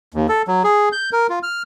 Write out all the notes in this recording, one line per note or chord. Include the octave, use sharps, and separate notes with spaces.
D#2
A4
F#3
G#4
G6
A#4
F4
F6